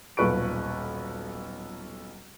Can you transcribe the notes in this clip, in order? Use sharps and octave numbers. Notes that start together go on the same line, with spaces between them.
D#1 B1 A#2 B4 C#6 D7